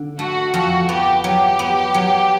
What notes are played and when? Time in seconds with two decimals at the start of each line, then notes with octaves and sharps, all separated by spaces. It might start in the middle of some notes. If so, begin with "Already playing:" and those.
Already playing: D3
0.19 A3 F#4
0.53 F2 F#4
0.89 B3 G4
1.24 F#3 G4
1.59 B3
1.94 F#3